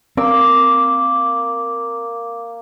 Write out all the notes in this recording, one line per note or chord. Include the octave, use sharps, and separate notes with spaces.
A#3 C4 D6 E6